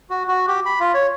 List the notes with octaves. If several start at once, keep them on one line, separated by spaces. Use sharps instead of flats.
F#4
F#4
G4
B5
F4
C#5